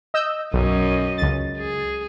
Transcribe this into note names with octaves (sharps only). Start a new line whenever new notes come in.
D#5 E6 G6
B1 F#2 C#4 D#5
C#2 A6
G#4